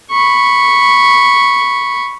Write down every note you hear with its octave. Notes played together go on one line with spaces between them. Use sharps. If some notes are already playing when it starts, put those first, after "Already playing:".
B5 C#6